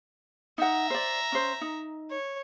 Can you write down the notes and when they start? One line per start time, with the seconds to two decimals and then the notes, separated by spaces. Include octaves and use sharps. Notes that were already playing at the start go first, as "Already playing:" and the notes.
0.58 D#4 E5 F#5 A#5
0.90 C5 D5
1.32 C#4 C5
1.61 D#4
2.10 C#5